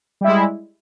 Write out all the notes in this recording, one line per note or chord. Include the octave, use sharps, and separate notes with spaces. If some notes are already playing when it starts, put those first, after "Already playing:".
G3 G#3 E4